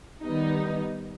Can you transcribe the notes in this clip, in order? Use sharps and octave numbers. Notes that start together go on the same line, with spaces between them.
D#3 G3 B3 D#4